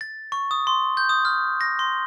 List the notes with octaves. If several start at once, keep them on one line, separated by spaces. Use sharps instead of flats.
A6
C#6
D#6
C6
G6
D#6
F6
A#6
C6